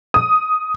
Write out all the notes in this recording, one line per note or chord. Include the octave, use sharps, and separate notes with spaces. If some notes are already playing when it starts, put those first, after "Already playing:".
D#6